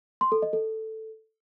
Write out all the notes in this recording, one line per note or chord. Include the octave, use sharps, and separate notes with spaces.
C6
A4
D#5
A4